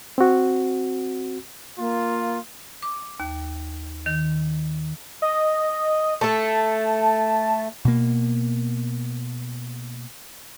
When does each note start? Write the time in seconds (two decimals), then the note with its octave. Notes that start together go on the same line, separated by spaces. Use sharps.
0.18 C4 F#4
1.78 A#3 F4
2.83 D6
3.20 D#2
4.06 D#3
5.22 D#5
6.21 A3 A4 A5
7.85 B2 A#3